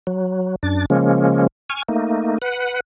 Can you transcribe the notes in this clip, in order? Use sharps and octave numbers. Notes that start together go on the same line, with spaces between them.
F#3
F#2 D4 A6
C#3 F3 G#3 A#3 C#4
G#5 C#6 F6
A3 A#3 D#4
B4 F#5